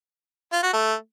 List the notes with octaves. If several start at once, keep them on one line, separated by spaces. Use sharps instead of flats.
F4
F#4
A3